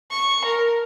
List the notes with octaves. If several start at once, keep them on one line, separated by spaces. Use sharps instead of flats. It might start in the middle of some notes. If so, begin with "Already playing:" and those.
C#6
A#4